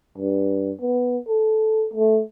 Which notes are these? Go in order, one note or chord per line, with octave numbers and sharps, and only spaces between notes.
G2
B3
A4
A3